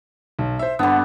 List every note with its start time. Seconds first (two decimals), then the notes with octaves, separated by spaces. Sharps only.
0.39 B1
0.59 C5 E5
0.79 G2 D3 B3